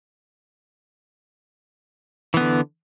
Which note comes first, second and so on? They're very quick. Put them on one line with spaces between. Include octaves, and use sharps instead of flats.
E3 B3 D3